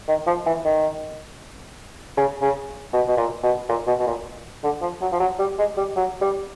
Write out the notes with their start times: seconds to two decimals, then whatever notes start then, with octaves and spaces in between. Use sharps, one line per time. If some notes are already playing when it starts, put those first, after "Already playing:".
0.08 D#3
0.27 F3
0.47 E3
0.65 D#3
2.17 C#3
2.42 C#3
2.93 B2
3.08 B2
3.17 A#2
3.43 B2
3.69 A#2
3.87 B2
3.99 B2
4.07 A#2
4.63 D3
4.82 F3
5.01 F#3
5.12 F3
5.20 F#3
5.39 G3
5.58 G#3
5.77 G3
5.96 F#3
6.21 G3